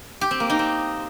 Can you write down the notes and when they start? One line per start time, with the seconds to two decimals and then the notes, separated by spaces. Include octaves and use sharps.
0.21 G4
0.31 C4
0.40 A#3
0.50 D#4
0.59 C4